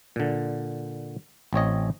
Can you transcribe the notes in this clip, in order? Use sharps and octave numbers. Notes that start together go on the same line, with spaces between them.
A#2 D3
A1 C4 C#5 D#5